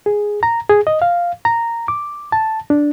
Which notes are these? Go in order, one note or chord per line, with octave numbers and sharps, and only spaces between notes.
G#4
A#5
G#4
D#5
F5
A#5
D6
A5
D4